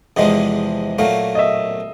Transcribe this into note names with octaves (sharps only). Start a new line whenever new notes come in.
E2 C3 F3 G#3 D#5
A#2 F#3 A3 F5
D#5
E5